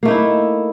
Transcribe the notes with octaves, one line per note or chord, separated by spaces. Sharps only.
A3 A#3 D#4 E4